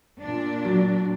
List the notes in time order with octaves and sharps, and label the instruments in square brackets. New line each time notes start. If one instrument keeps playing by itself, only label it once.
[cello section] A#2 D4
[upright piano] F#3